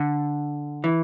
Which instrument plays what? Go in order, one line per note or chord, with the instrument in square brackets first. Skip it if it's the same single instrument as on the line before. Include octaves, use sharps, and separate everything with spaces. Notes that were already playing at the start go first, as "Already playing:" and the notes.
Already playing: [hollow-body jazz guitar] D3
E3